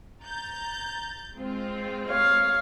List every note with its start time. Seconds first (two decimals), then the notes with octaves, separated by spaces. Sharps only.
0.24 A#5 G6 A6
1.35 G#3 C4 F4
2.09 C#5 F5